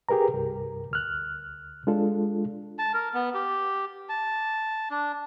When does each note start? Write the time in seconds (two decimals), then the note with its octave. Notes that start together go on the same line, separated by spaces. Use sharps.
0.09 G4 G#4 A#4 B4 A#5
0.34 C2 G2 A#4
0.91 D2 F6 F#6
1.87 G#3 D4 F4 A4
2.79 A5
2.94 A#4
3.14 B3
3.34 G4
4.09 A5
4.91 D4